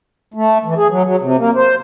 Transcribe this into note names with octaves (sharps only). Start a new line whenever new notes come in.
A3
E3
G#4
F#3
F#3
C3
A#3
C5